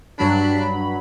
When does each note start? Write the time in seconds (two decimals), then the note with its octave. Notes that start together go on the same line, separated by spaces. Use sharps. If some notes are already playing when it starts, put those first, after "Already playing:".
0.18 G2 F#3 D4 B5